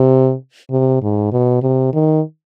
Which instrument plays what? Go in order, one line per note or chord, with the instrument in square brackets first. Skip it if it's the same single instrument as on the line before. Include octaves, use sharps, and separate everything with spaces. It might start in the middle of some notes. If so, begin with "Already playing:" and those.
Already playing: [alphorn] C3
C3
G#2
B2
C3
D#3